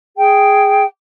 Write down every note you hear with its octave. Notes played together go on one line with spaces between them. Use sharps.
G#4 G5